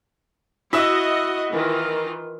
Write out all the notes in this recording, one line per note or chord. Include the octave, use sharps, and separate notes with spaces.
E4 F#4 D#5 E5 E6
D#3 E3 F4